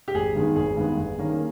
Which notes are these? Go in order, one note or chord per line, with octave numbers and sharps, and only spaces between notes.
G4
G#1 G#4
G2 D#3 G#3 B3
G#1 G#4
G2 D#3 G#3 B3
G1
G2 D#3 A#3 C#4